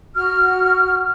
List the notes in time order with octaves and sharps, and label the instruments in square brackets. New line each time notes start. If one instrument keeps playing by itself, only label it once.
[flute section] F#4 F6